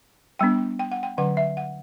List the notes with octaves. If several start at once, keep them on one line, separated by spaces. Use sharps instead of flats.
G3 B3 D4 G5
G5
F#5
G5
D3 F#3 C#4 F#5
E5
F#5